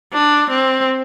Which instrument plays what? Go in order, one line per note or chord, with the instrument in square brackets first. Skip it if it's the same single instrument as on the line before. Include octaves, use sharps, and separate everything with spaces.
[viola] D4
C4